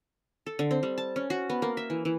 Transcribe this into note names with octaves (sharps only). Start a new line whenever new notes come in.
A4
D3
C4
G3
A5
C#4
F#4
B3
A#3
E5
E3
E3